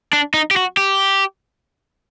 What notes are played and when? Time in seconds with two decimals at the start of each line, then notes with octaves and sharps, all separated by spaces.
0.13 D4
0.34 D#4
0.51 G4
0.56 F#4
0.77 G4